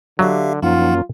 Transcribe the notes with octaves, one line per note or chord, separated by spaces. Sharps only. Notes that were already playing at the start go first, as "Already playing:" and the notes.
D3 F#3 G4 E5 F5
F#2 F3 A#3 C#4 D#4 F4 F#5